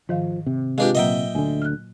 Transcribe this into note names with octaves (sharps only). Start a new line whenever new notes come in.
G#2 D#3 F3 F5
C3
G#3 D4 F4 G4 B4 F5
A#2 F#3 A#3 D#5 E5 G5
D2 D3 G#5
F6 F#6